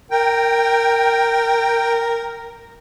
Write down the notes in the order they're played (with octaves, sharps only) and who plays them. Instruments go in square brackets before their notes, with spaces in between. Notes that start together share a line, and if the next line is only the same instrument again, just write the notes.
[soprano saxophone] A#4 [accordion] G5